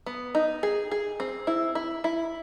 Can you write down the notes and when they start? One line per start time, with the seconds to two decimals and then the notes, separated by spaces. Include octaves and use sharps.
0.06 B3
0.35 D#4
0.63 G#4
0.91 G#4
1.20 C4
1.47 E4
1.75 E4
2.04 E4